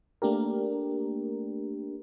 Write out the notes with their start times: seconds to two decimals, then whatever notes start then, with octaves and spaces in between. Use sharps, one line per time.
0.22 A3 A#3 D4 G4 A#4